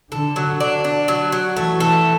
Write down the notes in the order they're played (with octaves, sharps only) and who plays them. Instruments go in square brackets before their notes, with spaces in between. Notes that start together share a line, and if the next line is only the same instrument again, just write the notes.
[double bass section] D3 [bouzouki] A4
[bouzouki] F#3
D4
D4
F#3
F#3
[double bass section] E3 [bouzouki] A3
[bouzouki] A4